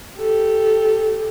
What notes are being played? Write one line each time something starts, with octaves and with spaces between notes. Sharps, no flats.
G4 A4